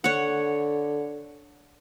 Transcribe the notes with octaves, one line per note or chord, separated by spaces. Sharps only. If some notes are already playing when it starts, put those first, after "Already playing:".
D3 C#5 F#5